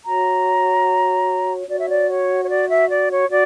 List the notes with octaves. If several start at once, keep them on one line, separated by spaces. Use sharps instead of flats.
F#4 C#5 A#5
F#4 C#5 D5
E5
D5
C#5
C#5
D5
E5
D5
C#5
F#4 D5